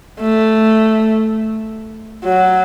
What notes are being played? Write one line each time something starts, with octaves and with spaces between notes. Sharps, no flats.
A3
F#3